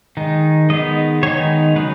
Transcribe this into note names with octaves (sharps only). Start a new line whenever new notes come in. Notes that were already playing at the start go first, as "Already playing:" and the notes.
D#3 G#3 D#4
D#3 G#3 B3 D#4 D#5
D#3 G#3 B3 D#4 C#5
C#3 F#3 D#4 B4